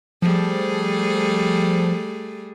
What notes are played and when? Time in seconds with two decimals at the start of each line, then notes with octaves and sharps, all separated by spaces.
0.22 F3 G3 A3 G#4